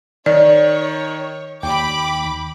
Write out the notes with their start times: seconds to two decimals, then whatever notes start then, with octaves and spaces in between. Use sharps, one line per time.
0.26 D#3 C#5 D5
1.63 D#2 G5 B5 D6